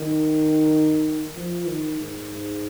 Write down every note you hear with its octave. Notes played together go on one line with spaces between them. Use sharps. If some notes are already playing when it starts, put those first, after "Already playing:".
Already playing: D#3
F3
D#3
G#2
G#2